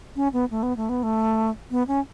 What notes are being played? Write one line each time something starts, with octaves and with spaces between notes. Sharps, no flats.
C#4
B3
A3
B3
A3
B3
A3
B3
C#4